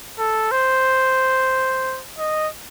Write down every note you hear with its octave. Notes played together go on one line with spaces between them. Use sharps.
A4
C5
D#5